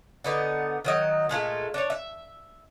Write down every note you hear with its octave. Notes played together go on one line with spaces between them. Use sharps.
D3 B3 D#4
D#3 F#3 D#5
A#2 G#3 A3 F4
D4 C#5
E5